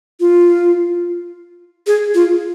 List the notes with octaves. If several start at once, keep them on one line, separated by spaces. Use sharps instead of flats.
F4
G#4
F4